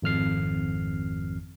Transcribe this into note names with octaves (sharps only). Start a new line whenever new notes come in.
G#1 F2 F6 C7